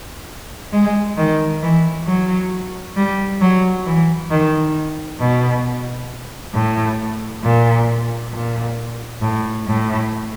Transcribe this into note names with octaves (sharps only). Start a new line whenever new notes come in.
G#3
D#3
E3
F#3
G3
F#3
E3
D#3
B2
A2
A#2
A#2
A2
A2